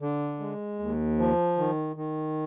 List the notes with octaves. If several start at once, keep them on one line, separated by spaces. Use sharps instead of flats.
D3
G#3
D#2
F3
D#3
D#3